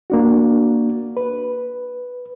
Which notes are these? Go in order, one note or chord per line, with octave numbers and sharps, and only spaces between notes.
A#3 D4 F#4
B4